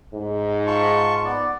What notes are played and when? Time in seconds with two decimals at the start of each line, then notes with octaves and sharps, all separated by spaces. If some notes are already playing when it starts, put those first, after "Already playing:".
0.14 G#2
0.67 F4 A5 C#6
1.25 B3 D5